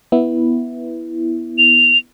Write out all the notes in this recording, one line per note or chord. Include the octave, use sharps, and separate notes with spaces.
B3 E4
F7